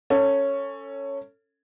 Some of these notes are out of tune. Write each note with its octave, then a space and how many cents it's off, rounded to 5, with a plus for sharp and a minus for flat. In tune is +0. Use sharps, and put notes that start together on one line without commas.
C#4 +0 A4 +25